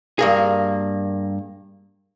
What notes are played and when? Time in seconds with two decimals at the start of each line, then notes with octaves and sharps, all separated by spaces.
0.19 G2 A#3 G#4